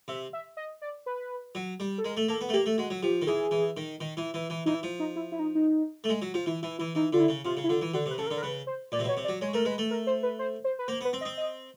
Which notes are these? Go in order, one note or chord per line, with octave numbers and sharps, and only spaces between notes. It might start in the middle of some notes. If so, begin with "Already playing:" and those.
C3 E5
E5
D#5
D5
B4
F#3
G3
A4
G#3 A#4
A3
A#3 A4
B3
A3
A#3 G4
A3
G#3 F#4
F#3
F3 G4
D#3
E3 G#4
E3
D#3
D#3
E3
E3
E3
E3 D#4
E4
F3
D#4
E4
E4
D#4
D#4
A3
G#3
F#3
F3 F4
E3 E4
E3 E4
E3 E4
E3 D#4
D3 F4
E4
C#3
C3 F4
C#3
E4
D3 F4
E3
D3 F#4
C3
B4
C#3 A4
A#4
D3
A#4
C#3 B4
C5
A#2 D5
C3
B2
C#5
C3
D5
F#3
G#3 C#5
A3 A#4
G#3 B4
A3
A#4
C5
B4
C5
C5
B4
A#3 C5
B3
B4
C4
D#5
C4
D#5